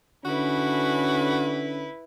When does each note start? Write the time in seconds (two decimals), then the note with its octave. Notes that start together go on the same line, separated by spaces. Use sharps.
0.25 D3 C#4 E4 F#4 B4